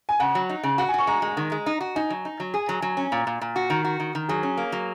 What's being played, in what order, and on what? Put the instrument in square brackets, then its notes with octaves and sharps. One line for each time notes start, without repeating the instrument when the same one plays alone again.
[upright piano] G#5
[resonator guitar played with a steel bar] C#3 [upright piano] F#5
[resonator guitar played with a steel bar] F#3
D#4
C#3
[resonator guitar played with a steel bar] F#4 [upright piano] F#5
[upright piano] G#5
[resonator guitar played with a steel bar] F#4 [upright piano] C#6
[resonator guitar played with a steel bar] G#3 [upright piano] A#5
[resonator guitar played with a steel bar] G#3
D#3
G#3
D#4
F#4
[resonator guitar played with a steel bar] D#4 [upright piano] G#5
[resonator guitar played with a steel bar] F#3
D#4
F#3
[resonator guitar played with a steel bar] G#4 [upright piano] G#5
[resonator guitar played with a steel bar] F#3 [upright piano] A#5
[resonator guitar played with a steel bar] F#3 [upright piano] G#5
[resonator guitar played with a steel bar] C#4
[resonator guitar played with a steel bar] A#2 [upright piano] A#5
[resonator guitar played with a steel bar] A#2
A#2
F#4
[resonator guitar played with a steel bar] D#3 [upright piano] A#5
[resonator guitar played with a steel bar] F#4
D#3
D#3
[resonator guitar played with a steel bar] F#3 [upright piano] G#4
[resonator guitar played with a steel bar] C#4
A#3
F#3